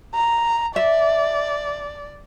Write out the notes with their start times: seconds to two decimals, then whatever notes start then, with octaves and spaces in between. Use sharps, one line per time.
0.15 A#5
0.76 D5 E5